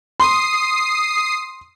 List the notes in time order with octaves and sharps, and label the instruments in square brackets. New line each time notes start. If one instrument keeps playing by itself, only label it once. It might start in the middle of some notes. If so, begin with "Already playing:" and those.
[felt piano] C6 [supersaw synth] D#6 C7